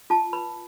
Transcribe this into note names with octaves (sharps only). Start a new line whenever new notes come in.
F4 A5
B4 B5